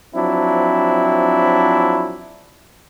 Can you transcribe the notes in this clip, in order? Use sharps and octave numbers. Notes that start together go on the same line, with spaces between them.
F3 F#3 C4 D4 E4